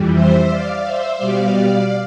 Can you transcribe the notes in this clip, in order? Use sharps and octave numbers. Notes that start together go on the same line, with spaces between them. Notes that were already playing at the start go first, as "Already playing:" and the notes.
Already playing: F2 E3 G3
C5 E5
D5 F5
C5 E5
B2 G3 D5 F5